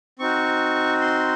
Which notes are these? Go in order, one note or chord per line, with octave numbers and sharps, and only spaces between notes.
C4 D#4 F#4 C#6
C6